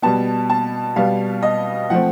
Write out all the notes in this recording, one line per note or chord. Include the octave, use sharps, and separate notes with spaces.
B2 G3 B3 A5
A5
B2 G3 B3 F5
D#5
F3 A3 C4 F#5